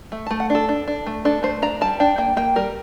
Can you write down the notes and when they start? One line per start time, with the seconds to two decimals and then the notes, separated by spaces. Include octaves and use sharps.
0.12 A3
0.27 A3 A5
0.40 F#5
0.50 D4 A4
0.69 D4
0.88 D4
1.07 A3
1.25 D4 A4
1.43 A3 C5
1.62 D4 A#5
1.81 G3 A5
2.00 D4 G5
2.18 A#3 G5
2.37 A#3 G5
2.56 G3 A#4